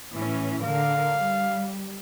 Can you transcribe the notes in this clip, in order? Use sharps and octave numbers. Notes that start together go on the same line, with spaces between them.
A2 E3 C#4
D3 A#4 F5
G3